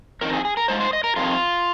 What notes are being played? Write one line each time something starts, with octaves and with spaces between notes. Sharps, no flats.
F2 D#3 C4 D#4 A#4
G#4
G#4
A#4
G#2 G#3 F4 C5
C5
D#5
A#4
F2 C3 D#3 F4